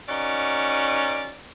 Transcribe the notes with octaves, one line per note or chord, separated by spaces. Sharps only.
C#4 D#4 F#4 A#4 D5